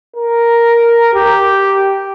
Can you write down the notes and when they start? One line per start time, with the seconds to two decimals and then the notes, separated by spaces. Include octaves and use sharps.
0.16 A#4
1.14 G4